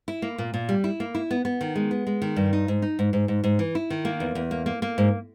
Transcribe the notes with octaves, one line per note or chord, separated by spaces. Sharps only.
E4
A#3
A#2
A#2
G3
E4
A#3
E4
B3
B3
D#3
G#3
B3
G#3
D#3
G2
D#4
G#2
D#4
G#2
G#2
G#2
G#2
E3
E4
D#3
A#3
E2
E2
A#3
A#3
A#3
G#2